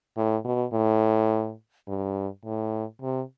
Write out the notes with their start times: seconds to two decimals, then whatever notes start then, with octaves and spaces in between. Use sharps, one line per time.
0.17 A2
0.45 B2
0.73 A2
1.88 G2
2.45 A2
3.02 C3